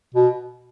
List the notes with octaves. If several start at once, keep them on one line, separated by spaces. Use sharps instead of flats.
B2